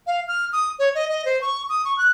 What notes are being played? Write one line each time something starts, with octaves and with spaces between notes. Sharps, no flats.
F5
F6
D#6
C#5
D#5
D#5
C5
C#6
D#6
C#6
F#6